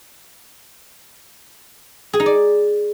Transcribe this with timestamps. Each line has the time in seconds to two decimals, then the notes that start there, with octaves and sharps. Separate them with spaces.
2.13 G#4
2.20 D#4
2.26 D5